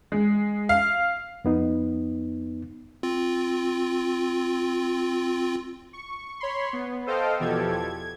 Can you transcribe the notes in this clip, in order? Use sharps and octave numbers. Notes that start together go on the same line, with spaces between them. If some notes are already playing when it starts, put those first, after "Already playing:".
G#3
F5
F2 B3 D#4
C4 F4
C#6
C#5 B5 C6
B3
A4 C5 D#5 F5 G5
E2 B2 F3 G4 A4 G#6
G#6